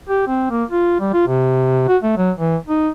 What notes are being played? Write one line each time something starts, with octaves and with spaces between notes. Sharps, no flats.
G4
C4
A#3
F4
G3
F4
C3
F#4
A3
F#3
E3
D#4